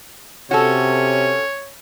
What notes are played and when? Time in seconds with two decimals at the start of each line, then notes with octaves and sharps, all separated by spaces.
0.51 C3 C#4 F#4 A4 C#5